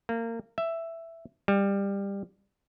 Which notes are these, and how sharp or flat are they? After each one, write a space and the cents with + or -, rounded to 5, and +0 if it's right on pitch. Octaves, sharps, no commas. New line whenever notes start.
A#3 -25
E5 +5
G3 +20